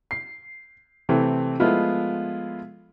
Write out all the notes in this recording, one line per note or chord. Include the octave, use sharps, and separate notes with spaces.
C7
C3 E3 A3 C4
F3 G#3 A3 B3 E4 F4